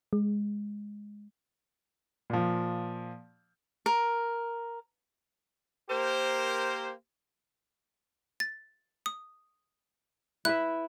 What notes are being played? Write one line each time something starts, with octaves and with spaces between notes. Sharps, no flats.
G#3
A#2 F3
A#4
A#3 G4 A#4 C5
A6
D#6
E4 B4 E5 F#6